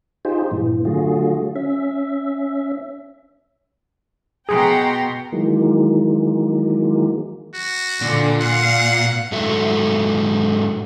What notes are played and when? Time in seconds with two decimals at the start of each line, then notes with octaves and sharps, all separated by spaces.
0.25 D#4 F4 G4 G#4 C5
0.51 G2 A#2 E3
0.85 D3 F#3 A3 F4 F#4 G#4
1.56 C#4 E5
4.49 B2 G#4 G5 A#5 C6
5.33 D#3 E3 F#3 G#3 A#3
7.54 F#4
8.02 A#2 D3
8.41 F5 F#5
9.32 G#2 F#3 A4 E5